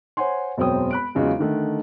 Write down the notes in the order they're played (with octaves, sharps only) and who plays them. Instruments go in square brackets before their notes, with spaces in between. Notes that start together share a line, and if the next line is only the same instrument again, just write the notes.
[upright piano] C5 C#5 F#5 G#5 C6
E1 F#2 C4 C#5 G5 D#6
B5 F#6 D7
E2 C#3 F#3 G#3 D#4 F4
D3 D#3 A3